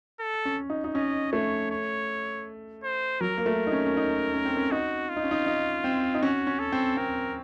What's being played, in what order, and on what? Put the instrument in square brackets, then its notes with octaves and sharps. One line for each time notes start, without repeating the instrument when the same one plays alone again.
[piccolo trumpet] A4
[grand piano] C#4
D#4
D#4
[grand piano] C#4 [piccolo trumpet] D#5
[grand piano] A3 [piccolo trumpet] C#5
[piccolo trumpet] C#5
C5
[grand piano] F#3 [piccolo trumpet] A#4
[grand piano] A#3
A3
D#4
C#4
C#4
D#4
C#4
C4
C#4
[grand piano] D#4 [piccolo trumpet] F#4
[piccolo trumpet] F4
[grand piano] D#4
C#4
D#4
D#4
C4
D#4
[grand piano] C#4 [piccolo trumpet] F#4
[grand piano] C#4
[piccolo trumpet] A4
[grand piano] C4
[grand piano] C4 [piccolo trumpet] A#4